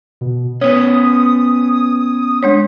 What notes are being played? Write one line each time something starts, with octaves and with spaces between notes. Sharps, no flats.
B2
B3 C#4 C#5 D#6
G#3 D4 C#5